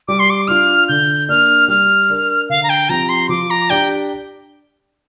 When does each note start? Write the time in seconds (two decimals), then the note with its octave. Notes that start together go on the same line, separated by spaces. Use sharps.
0.08 G3 D6
0.19 C6
0.30 D6
0.48 D4 F4 F6
0.88 D3 G6
1.29 A#3 D4 F6
1.68 G3 F6
2.10 D4 A#4
2.49 D3 F5
2.63 A#5
2.69 G5
2.89 F3 C4 G4 A#5
3.09 C6
3.29 F3 D6
3.50 A#5
3.70 D4 G4 G5